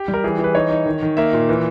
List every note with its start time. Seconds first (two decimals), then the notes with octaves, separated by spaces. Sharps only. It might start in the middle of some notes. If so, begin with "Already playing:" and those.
Already playing: G4
0.08 G3
0.14 A#4
0.24 E3 G#4
0.39 E3
0.44 B4
0.55 D#4 C#5
0.70 D#4
0.86 D#3
1.02 D#3
1.17 A#3 E5
1.33 A#2
1.49 E3